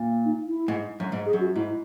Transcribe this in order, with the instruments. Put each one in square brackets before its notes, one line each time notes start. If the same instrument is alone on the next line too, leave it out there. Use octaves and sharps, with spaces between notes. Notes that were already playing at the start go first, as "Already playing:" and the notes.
Already playing: [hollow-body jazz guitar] A#2
[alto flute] D#4
E4
[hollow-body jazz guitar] G#2
F#2
G#2
[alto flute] G#4
[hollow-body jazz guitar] F#2
[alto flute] F#4
[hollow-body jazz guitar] G#2 [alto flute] E4